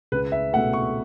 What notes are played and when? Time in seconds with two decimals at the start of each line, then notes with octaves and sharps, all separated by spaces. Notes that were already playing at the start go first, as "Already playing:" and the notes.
0.12 C#2 B4
0.32 E5
0.53 A3 F#5
0.56 B2
0.73 C#6